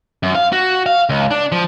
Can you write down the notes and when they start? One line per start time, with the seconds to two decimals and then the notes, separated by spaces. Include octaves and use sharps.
0.23 F#2
0.35 F5
0.53 F#4
0.86 F5
1.09 C#2
1.31 D4
1.52 F3